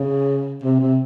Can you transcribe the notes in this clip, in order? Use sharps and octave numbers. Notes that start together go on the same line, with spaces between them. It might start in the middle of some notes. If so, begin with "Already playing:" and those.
Already playing: C#3
C3
C3